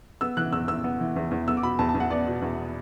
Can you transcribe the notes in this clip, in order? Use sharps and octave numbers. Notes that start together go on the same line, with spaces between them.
B3 E6
E3 F#6
E2 E6
E2 E6
B3
E3
E2
E2
B3 E6
D6
B2 B5
E2 A5
A5
E2
F#5
B3 D5
B2
E2